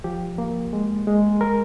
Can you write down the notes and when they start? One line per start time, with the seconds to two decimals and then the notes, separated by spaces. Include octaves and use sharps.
0.04 F3 G4
0.38 A#3
0.73 G#3
1.07 G#3
1.41 A#4